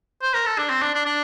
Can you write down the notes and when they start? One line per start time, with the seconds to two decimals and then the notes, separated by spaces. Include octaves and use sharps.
0.22 C5
0.34 A#4
0.46 A4
0.58 D4
0.70 C4
0.82 D4
0.94 D4
1.06 D4